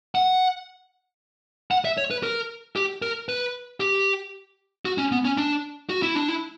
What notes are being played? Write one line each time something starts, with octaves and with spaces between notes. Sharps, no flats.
F#5
F#5
E5
C#5
B4
A#4
G4
A#4
B4
G4
F#4
C#4
B3
C#4
D4
F#4
E4
D4
E4